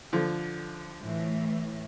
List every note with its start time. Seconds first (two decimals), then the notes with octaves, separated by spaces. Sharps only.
0.13 D3 F3
1.01 A2 E3